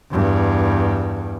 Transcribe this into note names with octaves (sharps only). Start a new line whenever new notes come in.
E2 G2